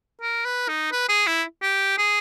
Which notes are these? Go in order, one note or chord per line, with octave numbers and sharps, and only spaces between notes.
A#4
B4
D#4
B4
G#4
E4
G4
G#4